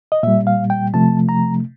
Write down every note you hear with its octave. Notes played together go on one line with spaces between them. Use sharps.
D#5
A#2 G3 E5
F5
G5
C3 F3 A3 A5
A#5